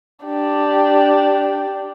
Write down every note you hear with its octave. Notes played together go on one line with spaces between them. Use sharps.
D4 G4